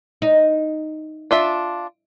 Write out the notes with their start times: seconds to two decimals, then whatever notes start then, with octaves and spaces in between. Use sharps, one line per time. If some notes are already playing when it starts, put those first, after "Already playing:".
0.22 D#4
1.31 D4 F4 E5